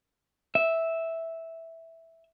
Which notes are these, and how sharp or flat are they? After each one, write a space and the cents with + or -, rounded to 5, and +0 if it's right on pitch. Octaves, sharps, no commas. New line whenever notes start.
E5 -5